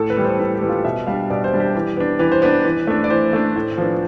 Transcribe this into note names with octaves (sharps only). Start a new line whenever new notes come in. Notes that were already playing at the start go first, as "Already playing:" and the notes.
Already playing: A2 A4
B4
E3 G3 B3
C5
A2 B4
G4
E3 G3 B3
F4
B2 E5
G3 D4 F5
B2 D5
C5
G3 D4
G4
E3
B3 D4
E3 B4
C5
B3 D4 B4
E3
A3 D4
D5
E3 C5
A3 D4
A2
F3 B3 D4